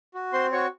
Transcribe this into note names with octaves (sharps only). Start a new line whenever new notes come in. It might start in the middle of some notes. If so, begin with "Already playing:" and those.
F#4
C4 C5 C6
F#4 C#5 C#6